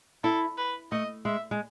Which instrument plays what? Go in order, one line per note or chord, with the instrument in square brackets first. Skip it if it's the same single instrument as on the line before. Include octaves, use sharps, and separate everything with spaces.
[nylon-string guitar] E4 [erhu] A4
[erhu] B4
[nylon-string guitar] A3 [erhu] D#5
[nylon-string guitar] G#3 [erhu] E5
[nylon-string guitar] G#3